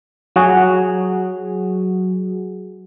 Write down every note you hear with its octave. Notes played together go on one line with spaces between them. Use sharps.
F#3 F#4 G#4